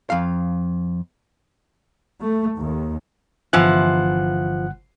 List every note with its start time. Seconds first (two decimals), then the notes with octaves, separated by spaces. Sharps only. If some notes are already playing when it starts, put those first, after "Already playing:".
0.10 F2 F5
2.22 A3
2.58 D#2
3.53 G1 E3 F3 F#5 G#5 F#6